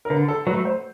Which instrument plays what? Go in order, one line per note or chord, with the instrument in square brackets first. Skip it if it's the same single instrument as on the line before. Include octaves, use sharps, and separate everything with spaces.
[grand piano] A#4
[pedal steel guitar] D3 [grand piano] B4
[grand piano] A4
[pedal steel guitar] F#3 [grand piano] B4
[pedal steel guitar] A3
[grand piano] C5